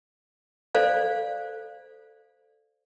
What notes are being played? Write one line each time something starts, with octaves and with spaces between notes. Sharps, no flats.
A4 C5 D5 F5